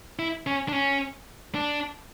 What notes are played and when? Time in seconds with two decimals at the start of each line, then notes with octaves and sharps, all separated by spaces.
0.19 E4
0.47 C#4
0.68 D4
0.72 C#4
1.54 D4